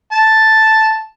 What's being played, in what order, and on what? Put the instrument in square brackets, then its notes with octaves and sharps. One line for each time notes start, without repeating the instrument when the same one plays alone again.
[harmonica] A5